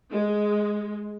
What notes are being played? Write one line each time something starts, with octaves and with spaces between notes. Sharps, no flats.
G#3